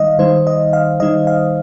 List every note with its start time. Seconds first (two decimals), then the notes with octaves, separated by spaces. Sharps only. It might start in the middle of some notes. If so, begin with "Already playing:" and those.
Already playing: D#3 G3 D#4 D#5 F5
0.19 D#3 G3 D#4 C5
0.47 D#5
0.73 F5
1.00 D#3 G3 D#4 D#5
1.27 F5